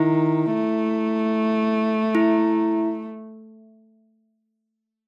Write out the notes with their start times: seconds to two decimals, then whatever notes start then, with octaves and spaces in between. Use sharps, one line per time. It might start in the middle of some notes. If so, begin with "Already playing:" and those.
Already playing: D#3 E4
0.54 A3
2.15 E4